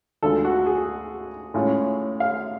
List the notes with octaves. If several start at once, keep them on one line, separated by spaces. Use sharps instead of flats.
D2 D3 G#3 D4 F4 A4
F#4
G#4
A2 G#3 C#4 F4
F5